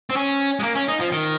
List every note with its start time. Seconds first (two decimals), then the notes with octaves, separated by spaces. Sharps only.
0.10 C4
0.16 C#4
0.60 G#3
0.64 A#3
0.75 C#4
0.88 D#4
1.00 F3
1.12 D#3